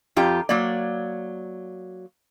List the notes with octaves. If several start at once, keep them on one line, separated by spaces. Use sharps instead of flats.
F2 F4 G4 A#5
F#3 A#3 D5